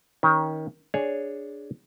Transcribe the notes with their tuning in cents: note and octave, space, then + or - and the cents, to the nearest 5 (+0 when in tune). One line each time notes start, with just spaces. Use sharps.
D#3 +20 C#4 +5
D4 +0 G#4 +0 C#5 +0